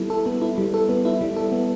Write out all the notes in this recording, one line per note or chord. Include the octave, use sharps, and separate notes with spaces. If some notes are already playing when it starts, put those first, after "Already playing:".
Already playing: G3 B3 E4 A4
A4
B3
E4
G3
A4
B3
E4
G3
A4
B3